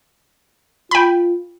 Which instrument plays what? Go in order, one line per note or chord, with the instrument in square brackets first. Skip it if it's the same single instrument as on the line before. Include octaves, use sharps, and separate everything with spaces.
[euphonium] F4 [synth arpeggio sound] G5 B5